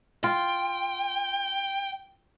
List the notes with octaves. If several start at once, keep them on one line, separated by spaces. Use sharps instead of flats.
F4 G5